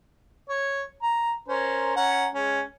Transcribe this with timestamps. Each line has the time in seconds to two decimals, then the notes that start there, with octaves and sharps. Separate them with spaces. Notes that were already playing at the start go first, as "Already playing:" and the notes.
0.49 C#5
1.02 A#5
1.48 C#4 A#4 C5
1.96 C#4 F#5 A#5
2.35 G#3 C#4